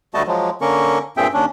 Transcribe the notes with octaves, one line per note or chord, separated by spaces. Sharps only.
D2 G3 A3 F#4 D#5 A5
F3 F#3 G#3
D3 A#3 C#4 A#4 C#6
G2 A#2 C4 G#4 E5 G5
D#2 C#4 D4